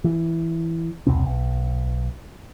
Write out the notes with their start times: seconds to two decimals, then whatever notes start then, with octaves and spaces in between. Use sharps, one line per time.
0.04 E3
1.07 E1 C2 C4
1.26 B1